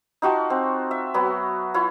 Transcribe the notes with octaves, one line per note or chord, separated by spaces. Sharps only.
D#4 F4 F#4 A5
C4
E5
F#3 B3 F#4
E4 F4 C#5